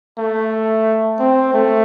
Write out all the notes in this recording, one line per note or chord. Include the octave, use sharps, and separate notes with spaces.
A3
C4
A3